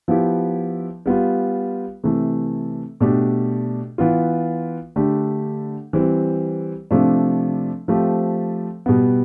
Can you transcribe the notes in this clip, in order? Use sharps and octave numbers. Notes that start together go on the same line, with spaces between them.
F3 B3 E4 G4
G3 B3 F4
C3 E3 A3
B2 A3 D4 G4
E3 B3 F4
D3 A3 D4 G4
E3 G3 C4
C3 F3 A3 D4
F3 A3 C4 G4
B2 G3 B3